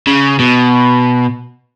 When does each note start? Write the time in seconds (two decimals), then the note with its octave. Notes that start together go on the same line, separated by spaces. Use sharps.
0.07 C#3
0.39 B2